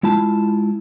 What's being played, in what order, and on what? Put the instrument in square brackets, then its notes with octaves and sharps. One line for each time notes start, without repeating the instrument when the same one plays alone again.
[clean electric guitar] G#3 E4 F4 A5